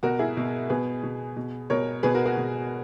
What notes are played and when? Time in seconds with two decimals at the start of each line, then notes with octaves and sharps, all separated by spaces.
0.03 B2 F#4 A#4
0.19 E4 G#4
0.37 B2
0.69 B2 G#4 B4
1.03 B2
1.37 B2
1.70 B2 A#4 C#5
2.03 B2 G#4 B4
2.14 F#4 A#4
2.25 F#4 A#4
2.37 B2